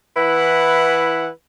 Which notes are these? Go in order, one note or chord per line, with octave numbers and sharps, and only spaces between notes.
E3 E4 B4 F#5